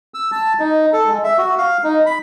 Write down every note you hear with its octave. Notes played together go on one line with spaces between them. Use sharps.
E6
A5
D#4
A4
G#3
E5
F#4
F5
D#4
B5